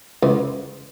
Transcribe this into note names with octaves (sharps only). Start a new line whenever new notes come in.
C#2